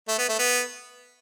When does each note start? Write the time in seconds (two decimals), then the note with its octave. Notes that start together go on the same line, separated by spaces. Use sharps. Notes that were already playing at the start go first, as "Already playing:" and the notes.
0.09 A3
0.19 B3
0.29 A3
0.39 B3